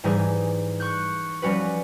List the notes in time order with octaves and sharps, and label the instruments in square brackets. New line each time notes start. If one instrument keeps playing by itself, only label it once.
[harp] G#2 E3 G3 D#4 G#4
C#6 F#6 G6
F3 G3 C#4 F#4 B4